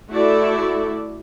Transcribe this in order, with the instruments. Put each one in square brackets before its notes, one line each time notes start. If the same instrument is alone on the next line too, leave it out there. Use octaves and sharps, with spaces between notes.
[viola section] A3 E4 F#4 A4 D5 E5